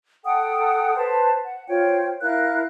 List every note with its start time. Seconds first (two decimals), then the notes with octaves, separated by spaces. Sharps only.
0.25 A4 F#5 G5 D#6
0.97 B4 C5 A5
1.43 F#5
1.69 F4 C5 C#5 G5
2.22 E4 A#4 F5 F#6